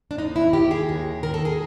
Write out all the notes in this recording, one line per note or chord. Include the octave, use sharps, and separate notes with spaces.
D4
D#2 D#4
E4
D#3 G4
G#4
D#2
D#3 A#4
A4
G#4